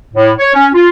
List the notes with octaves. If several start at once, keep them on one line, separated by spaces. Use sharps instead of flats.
A2
C#5
C#4
F4